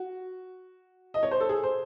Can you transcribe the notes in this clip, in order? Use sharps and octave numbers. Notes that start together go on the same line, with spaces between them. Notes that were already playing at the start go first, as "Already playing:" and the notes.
Already playing: F#4
D#5
C#5
C5
A4
G#4
C5